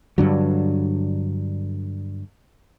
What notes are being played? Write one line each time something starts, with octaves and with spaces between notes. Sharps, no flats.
G2 D3 F#3